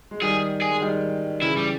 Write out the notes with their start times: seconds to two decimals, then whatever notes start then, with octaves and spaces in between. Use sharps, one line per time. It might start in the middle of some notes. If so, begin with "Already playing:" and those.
0.11 G#3
0.22 D#3 G3 G#4
0.62 G#4
0.71 G#3
0.81 D#3 G3
1.42 C#3 E3 E4
1.57 G3